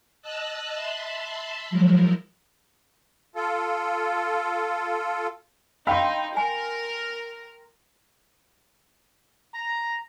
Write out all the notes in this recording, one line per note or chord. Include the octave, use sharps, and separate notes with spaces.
D#5 A5 E6 F#6
E5 A5 B5 C6
F3 F#3 G#3 E4 A#4
F4 A4
D#4 F5 G5 B5 C6 E6
A#4 G#5
A#5